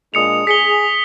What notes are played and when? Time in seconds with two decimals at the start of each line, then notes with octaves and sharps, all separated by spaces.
0.14 A#2 G#3 D4 D#6 C#7 F7
0.47 G#4 B6 C#7 G7